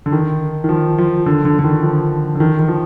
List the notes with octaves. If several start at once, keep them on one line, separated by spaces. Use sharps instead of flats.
D3
D#3
D#3
F3
F3
D3
D3
D3
D#3
F3
D3
D#3
D#3
F3